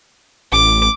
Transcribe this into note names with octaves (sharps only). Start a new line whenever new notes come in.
A1 D6